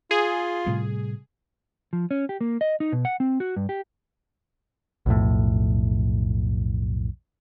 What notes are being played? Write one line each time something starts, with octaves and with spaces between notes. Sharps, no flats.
F4 G#4
A2 C3 G3
F3
C#4
G4
A#3
D#5
D#4
B2
F#5
C4
F#4
G2
G4
B1 F2 A2